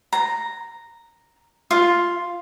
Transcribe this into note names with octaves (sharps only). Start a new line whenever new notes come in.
A#5
F4